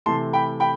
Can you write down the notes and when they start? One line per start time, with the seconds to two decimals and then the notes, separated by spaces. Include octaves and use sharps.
0.06 C3 E3 A3 A5 C6
0.33 G5 B5
0.60 G5 B5